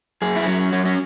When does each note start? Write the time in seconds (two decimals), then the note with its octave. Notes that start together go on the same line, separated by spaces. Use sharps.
0.22 F#2 G#4
0.36 E4
0.47 F#3 C#4
0.72 F#2 C#4
0.85 C#4